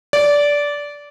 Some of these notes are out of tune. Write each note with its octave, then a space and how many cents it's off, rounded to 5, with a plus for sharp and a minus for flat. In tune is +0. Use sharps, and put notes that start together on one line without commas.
D5 -15